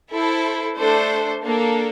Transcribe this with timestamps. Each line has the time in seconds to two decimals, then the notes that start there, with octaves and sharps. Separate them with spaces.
0.11 E4 A4 C5
0.77 A3 D4 A4 C5
1.42 A#3 D4 A4